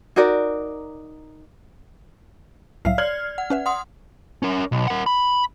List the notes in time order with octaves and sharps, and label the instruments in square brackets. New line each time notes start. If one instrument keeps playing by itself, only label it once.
[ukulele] D#4 F#4 A#4 D5
[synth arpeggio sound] C2 A2 F#3 [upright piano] E5 F5 [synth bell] C7
[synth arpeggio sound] C#5 [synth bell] D5 [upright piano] F6 G#6 F#7
[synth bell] F#5
[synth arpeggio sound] C#4 B4 E5
[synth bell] F#5 C6 D#6
[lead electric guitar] C#4 A#4
B1
A#4 F#5
B5